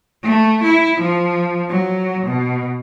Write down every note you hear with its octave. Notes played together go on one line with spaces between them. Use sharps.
A3
E4
F3
F#3
B2